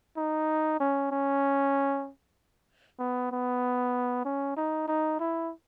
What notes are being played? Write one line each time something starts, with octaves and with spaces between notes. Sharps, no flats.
D#4
C#4
C#4
B3
B3
C#4
D#4
D#4
E4